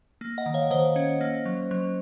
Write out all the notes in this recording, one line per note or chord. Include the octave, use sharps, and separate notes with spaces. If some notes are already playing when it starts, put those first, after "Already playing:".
A#3
D#5 F#5
D#3
C#5 F5
D#3 C5 D#5
C#4
A#3
F#3
F#3